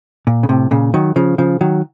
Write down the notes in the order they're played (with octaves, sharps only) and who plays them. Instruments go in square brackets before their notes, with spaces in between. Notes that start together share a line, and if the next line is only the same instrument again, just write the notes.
[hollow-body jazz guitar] A#2
C#3
A2 C3
A#2 C#3
D#3 F#3
C#3 F3
C#3 F3
D#3 F#3